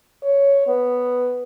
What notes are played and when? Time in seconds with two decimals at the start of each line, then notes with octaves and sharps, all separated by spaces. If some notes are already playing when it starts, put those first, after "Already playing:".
0.23 C#5
0.67 B3